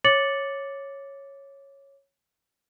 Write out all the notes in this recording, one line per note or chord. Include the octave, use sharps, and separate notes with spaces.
C#5 D6 A6 C#7 F#7